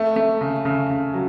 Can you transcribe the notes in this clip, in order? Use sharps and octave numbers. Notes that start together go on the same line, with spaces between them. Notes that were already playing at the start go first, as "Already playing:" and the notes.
Already playing: A3
A3
C#3
C#3
C#3
F#3